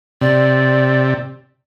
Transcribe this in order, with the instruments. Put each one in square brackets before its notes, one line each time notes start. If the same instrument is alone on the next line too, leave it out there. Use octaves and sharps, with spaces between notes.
[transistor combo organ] C3 [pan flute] D5